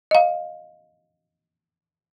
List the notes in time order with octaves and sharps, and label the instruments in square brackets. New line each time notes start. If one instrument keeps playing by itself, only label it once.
[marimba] D#5 F5